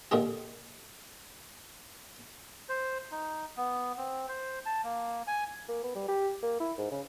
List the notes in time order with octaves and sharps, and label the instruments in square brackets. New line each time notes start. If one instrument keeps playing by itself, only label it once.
[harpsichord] A#2 D3 G#3 C4 G4
[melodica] C5
D#4
B3
C4
C5
A5
A#3
G#5
[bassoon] A#3
B3
G3
G4
A#3
E4
G#2
C#3